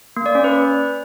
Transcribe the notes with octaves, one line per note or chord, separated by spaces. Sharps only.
A#3
D5
C#4
B4